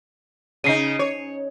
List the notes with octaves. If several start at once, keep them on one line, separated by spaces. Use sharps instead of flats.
C#3 D#4 C7 D#7
C#5